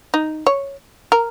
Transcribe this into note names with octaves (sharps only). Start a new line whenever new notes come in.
D#4
C#5
A#4